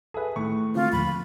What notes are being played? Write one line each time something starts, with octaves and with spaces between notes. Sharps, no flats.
G#4 A4 B4 E5
A2 D#3 C#6
D3 G#3 C4 F4
D#2 A#2 F3 B5